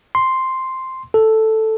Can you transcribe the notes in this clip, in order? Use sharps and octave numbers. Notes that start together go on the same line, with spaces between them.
C6
A4